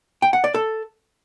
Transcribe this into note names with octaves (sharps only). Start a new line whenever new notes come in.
G5
F#5
D5
A4